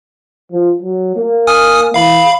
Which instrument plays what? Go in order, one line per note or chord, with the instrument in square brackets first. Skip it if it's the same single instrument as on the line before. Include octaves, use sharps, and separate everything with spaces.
[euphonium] F3
F#3
A#3
[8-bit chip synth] G#5 D#6 F6
[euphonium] E3 [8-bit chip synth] F5 B5